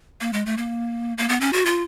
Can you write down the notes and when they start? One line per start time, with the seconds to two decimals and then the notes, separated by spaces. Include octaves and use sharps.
0.21 A#3
0.33 G#3
0.46 A3
0.57 A#3
1.18 A#3
1.29 B3
1.40 C#4
1.53 F#4
1.65 F4